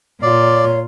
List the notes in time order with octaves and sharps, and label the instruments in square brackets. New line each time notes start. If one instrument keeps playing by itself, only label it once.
[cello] A#2 F4 [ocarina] C#5 [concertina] D5